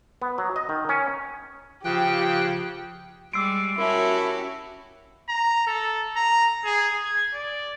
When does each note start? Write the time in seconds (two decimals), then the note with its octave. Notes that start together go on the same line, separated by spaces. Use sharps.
0.22 B3
0.38 F#3
0.56 D#5
0.69 D#3
0.89 C#4
1.85 C#3 F3 G4 G5 F#6
3.33 G3 G#3 C6 D6 E6 C7 D7
3.78 C#4 E4 F#4 G4 A#4 E5 A5
5.29 A#5
5.67 A4
6.16 A#5
6.65 G#4
7.04 G#6
7.34 D5